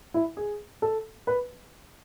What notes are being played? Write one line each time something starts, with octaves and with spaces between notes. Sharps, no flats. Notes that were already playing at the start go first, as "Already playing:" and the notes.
E4
G#4
A4
B4